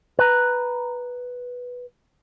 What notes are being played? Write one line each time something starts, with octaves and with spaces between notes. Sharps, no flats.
B4 A#5